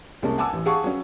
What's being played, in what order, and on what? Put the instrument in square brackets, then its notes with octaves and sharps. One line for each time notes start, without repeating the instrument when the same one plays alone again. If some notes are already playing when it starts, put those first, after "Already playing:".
[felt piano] C2 G#3 A#3 C#4 A5
F#5 G#5 A5 D6 E6
A1
G4 G#4 F5 F#5 A5 C#6
F#3 C#4